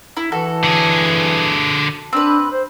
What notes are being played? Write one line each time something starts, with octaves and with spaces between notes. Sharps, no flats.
E4
E3 F#4 A4
D3 G#4
C4 D4 B4
C5